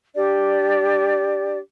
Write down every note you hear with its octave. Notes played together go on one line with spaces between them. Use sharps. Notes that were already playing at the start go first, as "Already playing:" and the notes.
D4 G4 D5